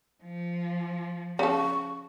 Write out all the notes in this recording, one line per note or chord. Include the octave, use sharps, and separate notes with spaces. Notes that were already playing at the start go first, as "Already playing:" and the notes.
F3
C#3 A4 C#6